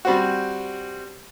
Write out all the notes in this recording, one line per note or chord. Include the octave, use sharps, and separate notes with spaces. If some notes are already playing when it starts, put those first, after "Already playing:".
G3 C4 F#4